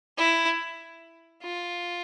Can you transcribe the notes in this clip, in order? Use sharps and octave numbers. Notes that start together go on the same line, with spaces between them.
E4
F4